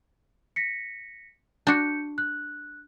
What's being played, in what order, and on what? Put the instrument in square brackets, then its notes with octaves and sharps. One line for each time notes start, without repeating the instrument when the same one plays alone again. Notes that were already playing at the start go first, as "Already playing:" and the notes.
[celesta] A#6 B6 C#7
[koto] D4 F#4 [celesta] G6 C#7
[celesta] F#6